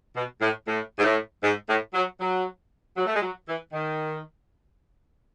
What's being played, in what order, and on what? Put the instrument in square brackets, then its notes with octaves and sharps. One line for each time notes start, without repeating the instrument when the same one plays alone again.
[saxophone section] B2
A2
A2
G#2
A2
G#2
A2
F#3
F#3
F#3
A3
G#3
F#3
E3
D#3